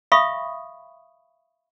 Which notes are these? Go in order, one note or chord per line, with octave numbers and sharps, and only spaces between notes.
E5 F5 B5 C#6 D#6